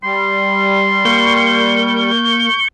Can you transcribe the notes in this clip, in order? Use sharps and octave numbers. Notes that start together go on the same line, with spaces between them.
G3 C6
A#3 C#6 G6